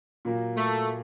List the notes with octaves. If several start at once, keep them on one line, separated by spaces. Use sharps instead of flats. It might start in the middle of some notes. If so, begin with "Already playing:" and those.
A#2 F#3 A#3
A3